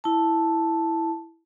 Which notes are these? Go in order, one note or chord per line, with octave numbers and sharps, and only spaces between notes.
E4 A5